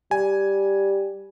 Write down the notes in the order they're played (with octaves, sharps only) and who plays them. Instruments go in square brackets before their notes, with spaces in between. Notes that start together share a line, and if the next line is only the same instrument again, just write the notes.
[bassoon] G3 [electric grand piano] G#5